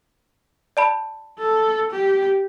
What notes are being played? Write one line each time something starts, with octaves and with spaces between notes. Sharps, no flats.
D5 A5 B5
A4
G4